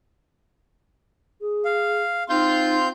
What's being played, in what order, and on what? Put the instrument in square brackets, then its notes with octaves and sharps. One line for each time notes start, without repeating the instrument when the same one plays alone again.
[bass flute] G#4
[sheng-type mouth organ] F5
[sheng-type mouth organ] C4 G6 [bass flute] D#4 [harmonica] F4 C6